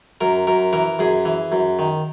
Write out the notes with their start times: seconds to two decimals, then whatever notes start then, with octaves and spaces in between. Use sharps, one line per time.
0.21 F#2 A#4
0.47 F#2 A#4
0.73 E3 A#4
0.99 F#2 G#4
1.25 E3
1.52 F#2
1.79 D#3